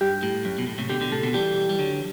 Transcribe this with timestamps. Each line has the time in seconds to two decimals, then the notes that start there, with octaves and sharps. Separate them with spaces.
0.01 G2 G4
0.23 A2
0.45 F#2
0.58 B2
0.67 A2
0.78 A2 C3
0.89 B2 D3 G4
1.01 B2 D3
1.12 A2 C3 A4
1.23 B2 D3
1.34 E3 G3 G4
1.69 G3
1.79 D3 F#3